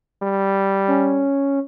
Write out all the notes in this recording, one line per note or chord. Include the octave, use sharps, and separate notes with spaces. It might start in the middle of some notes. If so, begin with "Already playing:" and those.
G3
C#4